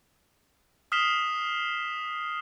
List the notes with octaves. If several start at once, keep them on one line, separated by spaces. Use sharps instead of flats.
D#6 F6 B6 C7 E7 G7